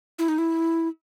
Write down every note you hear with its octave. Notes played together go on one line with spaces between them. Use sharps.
E4
D#4
E4